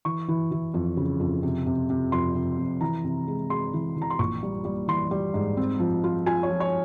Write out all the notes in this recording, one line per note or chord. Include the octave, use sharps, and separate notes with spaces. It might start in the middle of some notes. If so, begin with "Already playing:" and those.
E3 C#6
E3
E3
F2
C#3
F2
C3
C3
C3
F2 C6
C3
F2
E3 A#5
C3
G#3
G#3 C6
E3
E3 A#5
C6
A#1 C#6
G3
G3
E3 C6
G3
G#2
C4
F3
F4
F4 G#5
C#5
F3
C#5